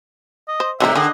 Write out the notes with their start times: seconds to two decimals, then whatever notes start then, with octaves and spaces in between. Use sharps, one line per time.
0.48 D#5
0.60 C5
0.80 A2 C3 D#3 G#3 E5 A#5
0.95 D3 D#3 G#4 D#5